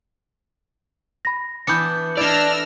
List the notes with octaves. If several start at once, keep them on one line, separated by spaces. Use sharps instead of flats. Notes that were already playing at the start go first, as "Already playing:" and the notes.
B5 A#6
E3 B3 D4 G6 C#7
D4 E4 A4 D5 E6 F6 A#6